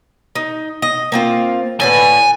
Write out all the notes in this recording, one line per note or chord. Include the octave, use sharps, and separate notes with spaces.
D#4
D#5
A#3 C4 F4
A2 D3 B4 G#5